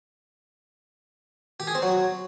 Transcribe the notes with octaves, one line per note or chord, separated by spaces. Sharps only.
G4
G#4
C4
F#3